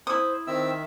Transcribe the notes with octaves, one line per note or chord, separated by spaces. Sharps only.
E4 C5 D#6
D#3 C4 E5 E6